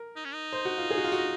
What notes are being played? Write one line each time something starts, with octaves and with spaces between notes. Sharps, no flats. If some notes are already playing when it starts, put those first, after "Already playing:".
Already playing: A#4
D#4
C#4
D#4
C5
F#4
F4
G#4
F#4
F4
F#4